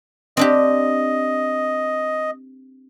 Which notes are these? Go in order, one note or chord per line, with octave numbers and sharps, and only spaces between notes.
C4 D4 G4 D#5